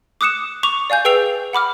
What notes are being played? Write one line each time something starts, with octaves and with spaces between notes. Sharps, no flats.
D6 D#6 F#6 C#7 E7
C#6 D6 F7
D5 F5 G#5 G6
G#4 B4 G5 E6 C7 F7
F#5 B5 D6 F6